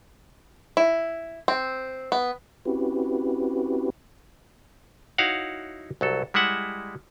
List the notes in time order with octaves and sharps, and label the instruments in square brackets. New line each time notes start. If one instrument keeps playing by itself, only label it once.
[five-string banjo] E4
C4
B3
[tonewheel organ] C4 C#4 E4 F#4 G4 B4
[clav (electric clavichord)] D#4 E4 F#4 C#5 F5 F#5
C2 F#3 A4
G3 G#3 E4 E5 F#5